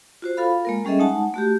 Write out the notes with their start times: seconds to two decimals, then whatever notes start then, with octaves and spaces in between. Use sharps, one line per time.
0.22 F4 F#4 C5
0.37 F4 A4 F5 B5
0.65 G#3 A#3 A#4
0.85 G3 C#4 G#4 A4 D#5 E5
0.99 G#3 D#4 F#5 A5
1.34 A3 F#4 G4